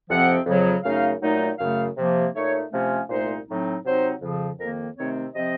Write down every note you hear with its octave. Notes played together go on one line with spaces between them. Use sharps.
F2 C3 F3 C4 F#5
F2 C#3 F#3
F#2 C#3 A3 D#4 F5
A#2 F#3 A3 D#4
F#2 C#3 A3 F5
C3 F3 A#3
A#2 A3 D#4 C#5
C3 F3 A3 C#4
C2 A#2 A3 D#4 C5
A2 F#3 C4 D#4
C3 F#3 C4 D#4 C5
F2 C#3 F3
F2 D#3 A#3 A#4
C3 D#3 A3 C4 C#5
C3 F3 C4 D#5